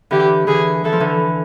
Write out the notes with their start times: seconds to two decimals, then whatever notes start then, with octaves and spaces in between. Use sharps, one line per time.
0.11 D3 E3 G4
0.47 D3 E3 G#4
0.84 E3 A4
0.93 F3
1.00 D3 E3